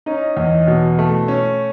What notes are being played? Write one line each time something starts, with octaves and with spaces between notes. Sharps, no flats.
C#4 D#4 D#5
E2
B2
A3
C#4